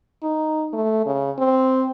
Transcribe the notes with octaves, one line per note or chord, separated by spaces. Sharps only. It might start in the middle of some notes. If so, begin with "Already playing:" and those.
D#4
A3
C#3
C4